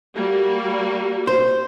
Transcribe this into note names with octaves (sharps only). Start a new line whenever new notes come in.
G3 A#3 F#4
C5